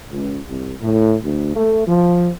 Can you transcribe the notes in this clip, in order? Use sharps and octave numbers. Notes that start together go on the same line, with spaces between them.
C#2
C2
A2
D2
A3
F3